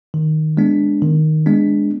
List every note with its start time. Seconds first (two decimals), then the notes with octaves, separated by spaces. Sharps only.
0.14 D#3
0.57 G#3 B3 D4
1.02 D#3
1.46 G#3 B3 D4